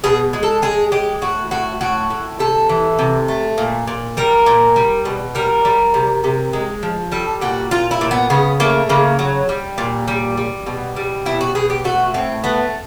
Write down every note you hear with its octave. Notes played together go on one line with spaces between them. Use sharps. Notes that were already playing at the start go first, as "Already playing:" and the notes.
B2 G#4
G#3
A4
G#3 G#4
G#3 G4
A2 F#4
A2 F#4
A2 F#4
A2
C3 A4
E3
C3
A3
A#2
A#2
G3 A#4
A#2
G3
B2
G3 A#4
G3
C3
C3
G#3
F3
G3 A4
A#2 F#4
A#2 F4
E4
A#2
B3
C#3 B3
A3 A#3
C#3 A#3
F#3
G3
A#2
G3
G3
B2
G3
B2 E4
F#4
B2 G#4
G4
A3 F#4
A2 C4
A3 B3